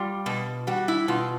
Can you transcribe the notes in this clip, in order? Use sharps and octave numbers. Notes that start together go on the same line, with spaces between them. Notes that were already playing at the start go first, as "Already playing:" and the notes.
Already playing: G3 F4
B2
G3 F#4
E4
B2 F4